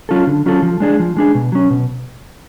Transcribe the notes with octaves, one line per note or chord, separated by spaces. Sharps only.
F#3 C#4 F4 A4
D3
F#3 C#4 F4 A4
F3
G#3 D4 G#4
F3
G#3 D4 G#4
B2
F#3 C#4
B2